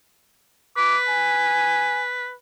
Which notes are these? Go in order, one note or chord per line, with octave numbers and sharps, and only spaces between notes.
B4 D6
G#5